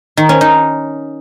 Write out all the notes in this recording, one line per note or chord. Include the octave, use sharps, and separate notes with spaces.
D#3
C#4
D#4